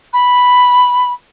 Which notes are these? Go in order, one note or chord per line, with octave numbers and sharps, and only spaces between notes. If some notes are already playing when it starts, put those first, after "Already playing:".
B5